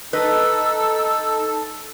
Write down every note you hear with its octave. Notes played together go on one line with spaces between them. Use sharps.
D#4 A4 B4 D#5 E6